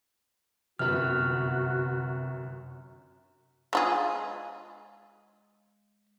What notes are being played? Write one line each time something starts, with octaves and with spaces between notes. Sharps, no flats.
G1 F#2 C3 F#4 B4 F6
G#3 F4 G#4